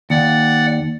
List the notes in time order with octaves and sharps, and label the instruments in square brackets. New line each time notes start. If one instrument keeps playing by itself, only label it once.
[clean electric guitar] D#2 [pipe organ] D5 F#5